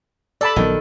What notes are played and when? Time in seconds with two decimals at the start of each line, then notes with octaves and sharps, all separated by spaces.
0.41 A4 D5 A5 B5
0.56 A#1 D#3 F#3 B3